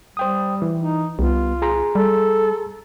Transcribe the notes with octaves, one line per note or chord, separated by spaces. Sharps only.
G3 C5 G5 D#6
E3
D#4
C2 G3 B3 F4
G#4 A#5 C6
G3 A4